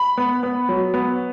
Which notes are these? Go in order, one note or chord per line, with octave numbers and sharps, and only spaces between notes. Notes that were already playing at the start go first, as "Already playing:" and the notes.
Already playing: B5
B3
B3
F#3
B3